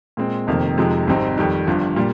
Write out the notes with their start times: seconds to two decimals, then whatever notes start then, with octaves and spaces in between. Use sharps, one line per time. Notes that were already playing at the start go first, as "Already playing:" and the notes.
0.17 A#2 G#3 C4
0.47 F1 F2 C3 D#3 A#3
0.77 F2 C3 F3 G#3 D#4
1.07 G#1 G#2 G3 C4 D#4
1.37 F2 D#3 G3
1.67 G1 G2 F3
1.96 A#2 G3